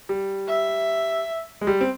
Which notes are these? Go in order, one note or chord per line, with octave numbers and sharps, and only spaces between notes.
G3
E5
G#3
G3
C4